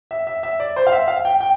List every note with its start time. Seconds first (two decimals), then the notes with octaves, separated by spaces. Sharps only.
0.11 E5
0.27 E5
0.43 E5
0.60 D5
0.76 C5
0.87 F5
0.92 E5
1.08 F5
1.25 G5
1.41 G5